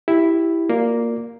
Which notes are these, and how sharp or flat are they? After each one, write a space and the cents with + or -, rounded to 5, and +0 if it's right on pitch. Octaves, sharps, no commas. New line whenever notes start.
E4 +0 G4 +0
A#3 +0 F4 +35 D5 +0